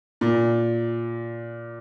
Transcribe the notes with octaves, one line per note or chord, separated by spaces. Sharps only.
A#2